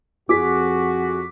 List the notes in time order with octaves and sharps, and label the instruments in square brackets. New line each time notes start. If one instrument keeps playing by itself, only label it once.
[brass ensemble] F2 F#4 [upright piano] G#4 [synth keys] D6 B6